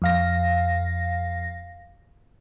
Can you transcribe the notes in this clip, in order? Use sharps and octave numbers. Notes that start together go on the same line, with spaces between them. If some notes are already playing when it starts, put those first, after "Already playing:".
F2 F5 A#6